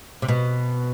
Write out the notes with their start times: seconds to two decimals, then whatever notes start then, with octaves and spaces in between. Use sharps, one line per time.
0.22 C3
0.28 B2